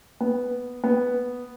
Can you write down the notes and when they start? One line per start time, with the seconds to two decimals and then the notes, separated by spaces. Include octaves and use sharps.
0.21 B3
0.84 B3